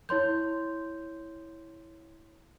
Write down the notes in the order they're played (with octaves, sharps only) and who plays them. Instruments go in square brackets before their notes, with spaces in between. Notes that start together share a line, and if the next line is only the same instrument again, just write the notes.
[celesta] E4 C#5 C6 G6